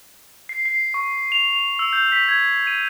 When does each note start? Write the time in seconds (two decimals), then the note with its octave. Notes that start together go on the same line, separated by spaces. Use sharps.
0.49 C7
0.65 C7
0.94 C#6
1.32 F7
1.53 F7
1.79 E6
1.93 G6
2.12 B6
2.28 G#6
2.67 D#7